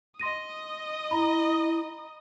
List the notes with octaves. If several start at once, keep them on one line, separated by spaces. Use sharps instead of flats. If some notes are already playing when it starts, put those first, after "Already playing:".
D#5 C6 D#6 A#6 D#7
E4 A#5 B5